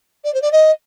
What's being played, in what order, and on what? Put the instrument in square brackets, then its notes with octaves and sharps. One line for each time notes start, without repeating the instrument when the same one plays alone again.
[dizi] D5
C5
D5
D#5